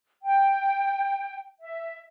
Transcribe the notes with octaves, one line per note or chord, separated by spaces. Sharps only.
G5
E5